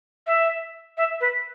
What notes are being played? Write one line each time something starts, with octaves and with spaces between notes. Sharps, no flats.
E5
E5
B4